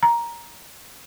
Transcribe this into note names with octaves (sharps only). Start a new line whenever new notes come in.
A#5